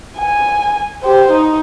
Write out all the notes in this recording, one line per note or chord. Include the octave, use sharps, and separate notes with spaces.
G#5
G4 C5
D#4